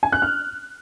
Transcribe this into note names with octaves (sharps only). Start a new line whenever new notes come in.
G#5
F#6
F6